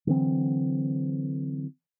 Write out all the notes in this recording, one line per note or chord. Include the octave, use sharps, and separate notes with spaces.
D3 E3 F#3 C4